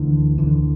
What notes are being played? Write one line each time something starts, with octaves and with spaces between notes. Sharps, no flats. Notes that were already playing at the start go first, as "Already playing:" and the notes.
Already playing: D2 D3 E3
D2 D3 E3